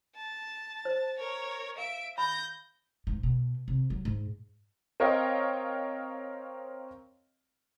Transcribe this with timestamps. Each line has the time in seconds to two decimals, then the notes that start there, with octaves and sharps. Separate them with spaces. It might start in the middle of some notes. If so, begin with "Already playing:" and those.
0.16 A5
0.85 C5
1.19 A#4 C#5
1.78 E5 F5 D7
2.18 B5 G6 A#6
3.07 G#2
3.23 B2
3.68 C3
3.90 F#3
4.05 G#2
5.00 C4 A#4 C#5 D#5 F5 G5